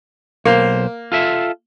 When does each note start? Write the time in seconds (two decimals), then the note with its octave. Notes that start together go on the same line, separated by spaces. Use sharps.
0.45 B1 A#3 C5
1.12 F4 A4 E5